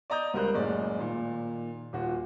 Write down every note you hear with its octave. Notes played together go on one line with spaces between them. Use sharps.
D5 D#5 A#5 D#6 G6
C#2 G3 A#4 C5 F#6
F#1 A2 G#3 D#4 D5
A#2 D#3
D#1 F4 F#4